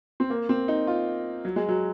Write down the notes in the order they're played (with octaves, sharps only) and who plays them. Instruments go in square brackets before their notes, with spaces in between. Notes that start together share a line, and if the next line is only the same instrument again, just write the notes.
[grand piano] C4
A#3
C4
D#4
F4
F#3
G#3
F#3